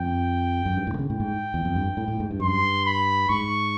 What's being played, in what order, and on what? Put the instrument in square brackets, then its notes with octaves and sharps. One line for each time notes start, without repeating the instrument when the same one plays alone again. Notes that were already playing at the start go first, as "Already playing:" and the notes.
Already playing: [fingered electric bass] F2 [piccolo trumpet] G5
[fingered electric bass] F#2
G2
A2
D3
C#3
[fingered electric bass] A2 [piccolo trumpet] G5
[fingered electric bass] G#2
E2
F2
G2
A2
A2
G#2
G2
[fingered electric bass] F#2 [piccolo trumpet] C6
[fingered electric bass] G2
[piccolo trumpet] B5
[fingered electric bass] G#2 [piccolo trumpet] C#6